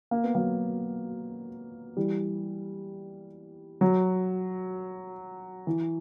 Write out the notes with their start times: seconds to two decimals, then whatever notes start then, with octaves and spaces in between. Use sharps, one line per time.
0.11 A#3
0.24 B3
0.35 F#3 A#3
1.97 E3 G3
3.81 F#3
5.67 E3